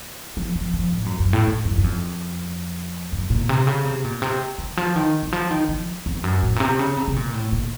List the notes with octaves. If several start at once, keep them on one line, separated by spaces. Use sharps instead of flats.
F3
F3
F3
A2
F#2
F#2
A2
A2
F#2
F#2
F2
F#2
A#2
C3
C#3
C3
A#2
C3
D#3
F3
D#3
D#3
F3
D#3
F3
F2
F#2
A2
A#2
C3
C#3
C3
C3
A#2
A2
A#2